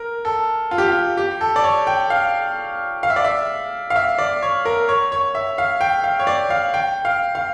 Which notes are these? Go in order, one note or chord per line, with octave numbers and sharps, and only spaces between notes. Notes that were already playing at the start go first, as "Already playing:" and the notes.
Already playing: A#4
A4
F4
G4
F4
G4
A4
D5
C#5
G5
F5
F5
E5
D5
E5
F5
E5
D5
C#5
A#4
C#5
C#5
E5
F5
G5
F5
C#5
D5
F5
G5
F5
F5